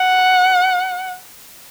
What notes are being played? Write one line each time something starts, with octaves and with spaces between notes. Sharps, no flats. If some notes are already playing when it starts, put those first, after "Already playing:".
Already playing: F#5